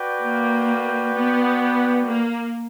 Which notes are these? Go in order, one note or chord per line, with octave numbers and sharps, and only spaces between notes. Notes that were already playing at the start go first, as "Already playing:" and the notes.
Already playing: F#4 B4 D5 G5
A#3
B3
A#3